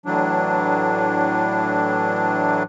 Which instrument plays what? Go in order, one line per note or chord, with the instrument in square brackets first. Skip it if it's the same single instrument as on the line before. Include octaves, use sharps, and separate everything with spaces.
[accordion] A2 E3 F#3 D4